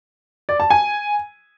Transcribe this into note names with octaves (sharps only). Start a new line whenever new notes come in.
D5
A5
G#5